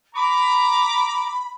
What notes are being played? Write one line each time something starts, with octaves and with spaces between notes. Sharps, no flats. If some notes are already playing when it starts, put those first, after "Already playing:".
A#5 B5 D6